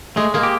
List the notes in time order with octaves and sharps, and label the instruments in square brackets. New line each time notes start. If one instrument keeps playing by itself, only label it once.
[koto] G#3 [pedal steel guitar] A3
[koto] G#3 A#3
[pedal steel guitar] G4